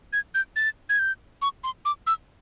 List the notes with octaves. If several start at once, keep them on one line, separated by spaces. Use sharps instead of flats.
G#6
G6
A6
G#6
G6
C#6
C6
D6
E6